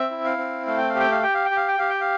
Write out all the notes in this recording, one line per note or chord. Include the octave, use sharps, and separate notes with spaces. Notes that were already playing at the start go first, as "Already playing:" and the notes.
Already playing: C4 E5
E4
F5
C4
A3 F5
G5
F5
G4 G5
F5
G4 G5
F5
G5
G4
F5
G5
G4 F5
G5
F5